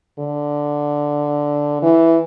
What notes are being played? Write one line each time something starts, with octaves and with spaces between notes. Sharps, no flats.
D3
E3